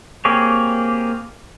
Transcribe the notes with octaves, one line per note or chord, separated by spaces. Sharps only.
A#3 C4 G4 G#4 C#5